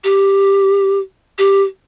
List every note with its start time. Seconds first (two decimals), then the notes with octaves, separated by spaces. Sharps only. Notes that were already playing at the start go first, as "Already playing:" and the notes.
0.04 G4
1.39 G4